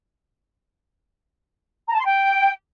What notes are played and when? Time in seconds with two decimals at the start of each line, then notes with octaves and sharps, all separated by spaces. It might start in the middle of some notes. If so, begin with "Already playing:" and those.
1.88 A#5
1.94 A5
1.99 C6
2.05 G5